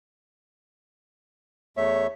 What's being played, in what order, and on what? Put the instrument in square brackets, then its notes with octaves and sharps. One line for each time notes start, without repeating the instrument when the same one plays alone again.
[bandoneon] E2 A3 E5 [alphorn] C#5